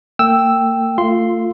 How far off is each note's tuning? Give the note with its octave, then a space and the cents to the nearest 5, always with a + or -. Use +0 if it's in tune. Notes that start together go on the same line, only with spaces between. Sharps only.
A#3 -40 G5 +0 E6 +0
A3 +35 F4 +0 C6 -5